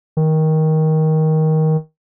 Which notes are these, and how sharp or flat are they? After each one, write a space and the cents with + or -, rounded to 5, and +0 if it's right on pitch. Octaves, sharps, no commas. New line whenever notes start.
D#3 +15